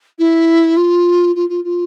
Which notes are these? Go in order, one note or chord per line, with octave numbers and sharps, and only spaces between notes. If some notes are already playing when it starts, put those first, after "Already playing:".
E4
F4
F4
F4
F4